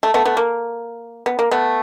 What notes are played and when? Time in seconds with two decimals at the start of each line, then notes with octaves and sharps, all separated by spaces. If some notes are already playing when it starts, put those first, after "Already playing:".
0.03 A3
0.14 A3 B3
0.25 A3 B3
0.37 A#3
1.26 B3
1.39 A#3
1.51 A3 B3